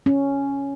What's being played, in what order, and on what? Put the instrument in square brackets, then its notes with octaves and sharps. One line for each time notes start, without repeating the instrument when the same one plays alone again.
[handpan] C#4